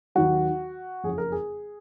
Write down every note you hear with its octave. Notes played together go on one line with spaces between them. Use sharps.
D#2 D#3 F#3 F#4
F#1 F2 C#3 G#4
A#4
G#4